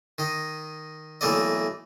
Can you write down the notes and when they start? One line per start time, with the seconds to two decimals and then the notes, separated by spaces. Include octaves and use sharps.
0.18 D#3 D#5
1.21 B1 E3 A3 A#3 D5 D#5